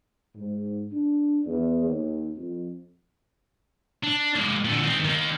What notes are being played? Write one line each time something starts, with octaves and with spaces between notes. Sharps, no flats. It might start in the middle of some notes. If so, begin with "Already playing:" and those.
G#2
D4
E2
D#2
F2
D4
G#3 A#3
A#2 D3
D#3 C4
D#3 A#3